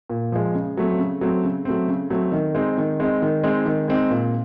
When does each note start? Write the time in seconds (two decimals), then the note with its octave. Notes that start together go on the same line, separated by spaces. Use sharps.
0.10 A#2
0.32 F3 G#3
0.55 C#3
0.77 F#3 A3 C4
0.99 C#3
1.21 F#3 A3 C4
1.44 C#3
1.65 F#3 A3 C4
1.88 C#3
2.10 F#3 A3 C4
2.32 D#3
2.55 G#3 C4 D#4
2.78 D#3
3.00 G#3 C4 D#4
3.22 D#3
3.43 G#3 C4 D#4
3.66 D#3
3.88 G#3 C4 D#4
4.10 A#2